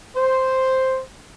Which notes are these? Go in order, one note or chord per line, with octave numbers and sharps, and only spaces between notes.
C5